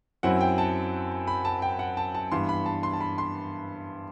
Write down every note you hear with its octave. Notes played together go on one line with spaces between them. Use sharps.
F#2 F#3 C4 E4 F#5
G5
A5
B5
A5
G5
F#5
A5
A5
G2 E3 B3 C6
B5
A5
C6
A5
B5
C6